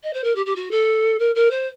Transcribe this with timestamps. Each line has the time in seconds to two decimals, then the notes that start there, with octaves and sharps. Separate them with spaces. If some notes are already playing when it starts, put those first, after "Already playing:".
0.03 D#5
0.13 C5
0.24 A#4
0.35 G4
0.46 G4
0.55 F#4
0.71 A4
1.19 A#4
1.35 A#4
1.50 C5